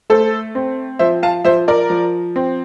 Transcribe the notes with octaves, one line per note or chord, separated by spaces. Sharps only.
A3 A4 C5
C4
F3 C5 E5
F5 A5
F3 C5 E5
A#4 D5
F3
C4